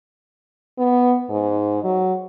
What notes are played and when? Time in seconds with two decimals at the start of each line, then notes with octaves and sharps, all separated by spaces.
0.78 B3
1.29 G#2
1.84 F#3